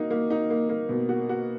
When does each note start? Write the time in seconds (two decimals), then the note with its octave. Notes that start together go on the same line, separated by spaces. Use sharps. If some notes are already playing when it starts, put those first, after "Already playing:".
Already playing: A#3 D#4 F#4
0.11 A#3
0.30 D#4
0.50 A#3
0.69 A#3
0.89 B2
1.09 F#4
1.29 F#4